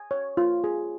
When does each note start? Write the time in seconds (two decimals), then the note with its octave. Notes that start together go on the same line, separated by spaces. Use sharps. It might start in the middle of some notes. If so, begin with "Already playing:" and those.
Already playing: G#5
0.11 C#5
0.37 F4
0.64 G#4